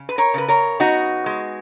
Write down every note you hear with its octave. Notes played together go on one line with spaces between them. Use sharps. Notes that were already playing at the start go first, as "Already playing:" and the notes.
Already playing: C#3
B4
A#4 C#5
C#3 B4
A#4 C#5
B3 D#4 F#4
G#3